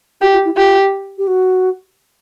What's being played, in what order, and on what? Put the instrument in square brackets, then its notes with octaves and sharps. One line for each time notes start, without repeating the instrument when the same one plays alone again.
[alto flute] F#4 [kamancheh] G4
[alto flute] F4
E4
[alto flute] F4 [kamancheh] G4
[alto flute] G4
F#4